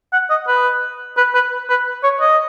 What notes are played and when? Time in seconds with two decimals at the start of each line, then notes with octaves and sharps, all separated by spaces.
0.13 F#5
0.30 D#5
0.48 B4
1.17 B4
1.35 B4
1.70 B4
2.04 C#5
2.21 D#5